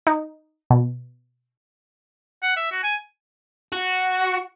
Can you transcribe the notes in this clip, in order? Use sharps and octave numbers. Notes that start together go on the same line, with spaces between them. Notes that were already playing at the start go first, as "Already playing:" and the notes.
D#4
B2
F#5
E5
F#4
G#5
F#4